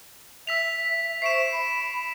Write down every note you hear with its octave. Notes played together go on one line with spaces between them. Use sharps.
E5 E6 B6 F7
C5 E5 C#6 C7 D7 E7
B5